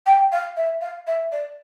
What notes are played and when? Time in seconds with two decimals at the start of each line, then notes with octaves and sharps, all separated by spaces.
0.06 G5
0.32 F5
0.57 E5
0.81 F5
1.07 E5
1.32 D5